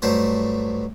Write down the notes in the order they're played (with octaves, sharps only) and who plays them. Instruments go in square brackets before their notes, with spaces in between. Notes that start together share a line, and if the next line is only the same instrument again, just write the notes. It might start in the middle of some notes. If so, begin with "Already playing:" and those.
[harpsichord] G2 F#3 A3 C5